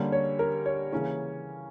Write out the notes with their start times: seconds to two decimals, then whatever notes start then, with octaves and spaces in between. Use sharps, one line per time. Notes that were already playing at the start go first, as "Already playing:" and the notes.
Already playing: D3 G3 A#3 C#4
0.12 C#5
0.39 A#4
0.66 C#5
0.92 C#3 E3 A#3 C#4